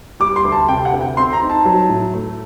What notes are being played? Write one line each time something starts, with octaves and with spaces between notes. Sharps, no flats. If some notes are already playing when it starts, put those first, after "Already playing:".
G3 D6
C6
D2
A5
C3 G5
F#5
D2
G5
C4 C6
A#5
D#4
A5
F#3
A2
A3